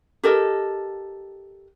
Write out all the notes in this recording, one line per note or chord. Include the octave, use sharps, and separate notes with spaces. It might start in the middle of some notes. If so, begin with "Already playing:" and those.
G4 A4 A#4 D#5